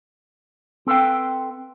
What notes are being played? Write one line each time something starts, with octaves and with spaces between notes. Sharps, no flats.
C4 A4 B4 F5 G5